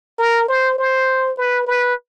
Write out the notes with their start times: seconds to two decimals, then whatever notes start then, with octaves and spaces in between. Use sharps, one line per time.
0.19 A#4
0.48 C5
0.78 C5
1.38 B4
1.67 B4